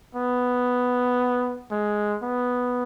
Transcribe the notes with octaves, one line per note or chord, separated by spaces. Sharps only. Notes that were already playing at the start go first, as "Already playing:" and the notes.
B3
G#3
B3